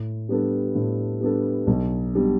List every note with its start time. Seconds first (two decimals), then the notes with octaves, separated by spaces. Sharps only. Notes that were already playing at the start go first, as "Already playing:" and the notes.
Already playing: A2
0.29 G3 B3 D4 A4
0.75 A2
1.21 G3 B3 D4 A4
1.67 B1
2.14 B2 G3 D4